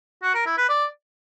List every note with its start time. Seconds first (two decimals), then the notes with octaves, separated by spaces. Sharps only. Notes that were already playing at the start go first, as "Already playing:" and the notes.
0.23 F#4
0.34 A#4
0.46 E4
0.57 B4
0.69 D5